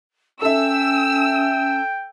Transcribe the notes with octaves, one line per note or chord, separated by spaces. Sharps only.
C#4 A4 E5 G5 E6